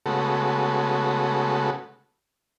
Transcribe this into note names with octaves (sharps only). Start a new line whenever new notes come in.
C#3 G#3 A3 B3 F#4 A4